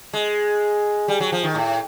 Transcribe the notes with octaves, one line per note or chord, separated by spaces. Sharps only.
G#3
G3
F#3
F3
D#3
A2